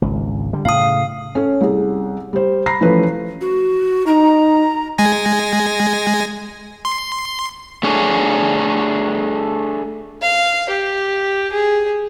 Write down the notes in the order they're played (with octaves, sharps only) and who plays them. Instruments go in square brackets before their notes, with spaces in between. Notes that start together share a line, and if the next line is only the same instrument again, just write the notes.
[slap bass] G#1 C#2
D3 G3
[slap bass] A2 C#3 [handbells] F5 D#6
[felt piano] C#4 A4 C#5
C2 G#4
G3 C5
A#5 B5 A#6 C7
E3 F3 A3 C#4 B4 C#5
[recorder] F#4
[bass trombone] D#4 [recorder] A#5
[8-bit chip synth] G#3 G#5 A#6
C6
[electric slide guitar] A3 D4 G#4 C#5
[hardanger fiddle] F5
G4
G#4